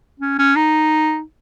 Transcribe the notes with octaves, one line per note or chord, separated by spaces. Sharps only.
C#4
C#4
D#4